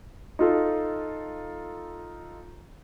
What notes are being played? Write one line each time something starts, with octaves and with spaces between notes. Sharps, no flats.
D#4 F4 A4